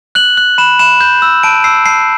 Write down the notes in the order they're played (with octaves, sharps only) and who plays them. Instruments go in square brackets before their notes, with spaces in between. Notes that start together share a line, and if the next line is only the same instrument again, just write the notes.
[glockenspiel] F#6 F#7
F#6
B5 E7
B5 E7
G6
E6
A5 D7
E6 C7
A5 C7